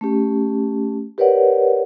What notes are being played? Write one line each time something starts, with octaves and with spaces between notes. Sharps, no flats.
A3 C#4 G4
G4 A#4 B4 C#5 D5 F#5